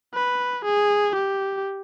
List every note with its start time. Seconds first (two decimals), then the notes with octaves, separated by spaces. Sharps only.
0.14 B4
0.65 G#4
1.16 G4